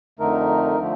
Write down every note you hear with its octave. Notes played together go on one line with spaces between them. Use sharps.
F2 D3 A3 D#4 A#4
D3 F3 A3